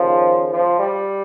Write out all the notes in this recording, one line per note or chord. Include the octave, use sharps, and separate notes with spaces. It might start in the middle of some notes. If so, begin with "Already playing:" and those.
Already playing: D#2 C#3 F3
F3
G3